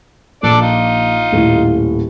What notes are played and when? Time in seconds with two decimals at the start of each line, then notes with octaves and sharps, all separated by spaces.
0.43 A#1 D4 A4 D5
0.61 D#4 F4
1.32 D#1 A2